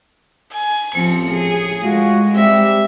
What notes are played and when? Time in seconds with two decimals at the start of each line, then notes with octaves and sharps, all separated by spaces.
0.53 G#5
0.95 A1 A2 F3 C4 C#7
1.31 G#4
1.83 A2 G#3 F4 F#4
2.36 G3 C4 G4 E5